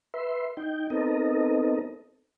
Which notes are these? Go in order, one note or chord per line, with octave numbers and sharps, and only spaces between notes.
B4 E5 C6
D#4 G5
B3 C4 D#4 A4 A#4 D#5